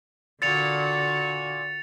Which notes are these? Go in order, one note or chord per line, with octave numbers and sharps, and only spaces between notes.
A#2 D3 F#4 A6 C#7 F7